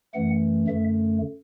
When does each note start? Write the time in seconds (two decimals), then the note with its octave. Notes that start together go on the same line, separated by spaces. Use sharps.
0.14 F#2 E3 A3 F#5
0.68 F#2 D3 A3 E5